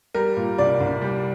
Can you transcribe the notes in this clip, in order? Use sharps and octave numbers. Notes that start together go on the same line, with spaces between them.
G3 A#4
A#2
C2 D5
C2
G3